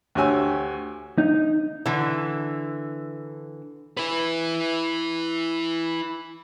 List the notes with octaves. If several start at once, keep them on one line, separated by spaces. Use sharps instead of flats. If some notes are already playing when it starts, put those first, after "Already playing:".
D2 F#4 G4 C#5 G#5 E6
D#4
D3 E3
E4 B4